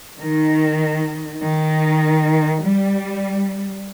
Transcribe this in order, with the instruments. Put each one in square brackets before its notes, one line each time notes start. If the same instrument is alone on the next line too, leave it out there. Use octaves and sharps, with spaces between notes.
[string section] D#3
D#3
G3